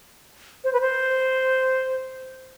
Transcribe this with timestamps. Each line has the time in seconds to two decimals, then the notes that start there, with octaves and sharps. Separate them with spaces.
0.64 C5
0.73 B4
0.81 C5